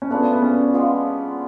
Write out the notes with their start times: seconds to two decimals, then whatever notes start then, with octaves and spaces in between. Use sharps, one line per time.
0.02 C#4
0.10 A3 B3 D4 F4 G#4
0.33 B3
0.42 C#4
0.74 G#3 B3 F4